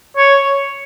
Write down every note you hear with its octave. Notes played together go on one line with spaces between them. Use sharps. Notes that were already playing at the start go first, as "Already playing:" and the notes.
C#5